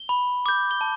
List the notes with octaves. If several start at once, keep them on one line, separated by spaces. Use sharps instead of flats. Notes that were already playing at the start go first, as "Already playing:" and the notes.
Already playing: G7
B5
D6 G6
G7
A5